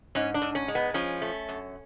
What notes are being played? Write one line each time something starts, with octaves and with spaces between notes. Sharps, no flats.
G#2 C#4
D4
G#2
C#4
G#3
B3
F3 C#4
A3
F#2